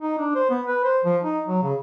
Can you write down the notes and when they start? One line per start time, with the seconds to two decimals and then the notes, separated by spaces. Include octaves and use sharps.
0.01 D#4
0.18 D4
0.35 C5
0.50 B3
0.67 B4
0.84 C5
1.05 F3
1.23 D#4
1.47 F#3
1.63 C#3